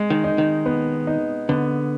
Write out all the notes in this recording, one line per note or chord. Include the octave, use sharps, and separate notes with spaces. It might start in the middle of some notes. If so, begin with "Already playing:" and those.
Already playing: G#3
D#3
D#4
D#3
B3
D#4
D3 B3